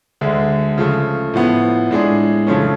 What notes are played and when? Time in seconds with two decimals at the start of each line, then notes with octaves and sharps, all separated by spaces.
0.21 D2 D3 G#3
0.78 C#3 F3 A3
1.34 A2 F3 B3
1.91 A2 G#3 D4 G#4
2.47 F2 C#3 F3 A3 C#4